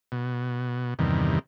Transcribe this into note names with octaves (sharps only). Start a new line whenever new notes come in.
B2
E2 G2 C3 D#3